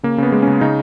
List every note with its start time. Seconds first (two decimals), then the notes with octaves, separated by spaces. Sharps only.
0.03 C#3 A#3
0.18 C#3 B3
0.32 G#3
0.42 C#4
0.47 C#3
0.61 C#3 D#4